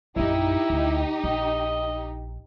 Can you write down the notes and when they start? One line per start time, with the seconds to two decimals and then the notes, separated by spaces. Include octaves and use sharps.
0.16 A#1 F#2 D#4 E4 G4
0.70 D2
1.24 A#1 D#5